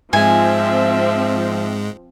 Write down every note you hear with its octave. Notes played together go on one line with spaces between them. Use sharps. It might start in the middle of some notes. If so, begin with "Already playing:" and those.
G#2 F3 G#3 C4 E5 G#5